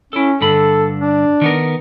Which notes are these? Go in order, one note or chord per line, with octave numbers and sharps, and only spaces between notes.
C#4 E4 A4
G2 D3 A4 B5
D4
D#3 B3 A#4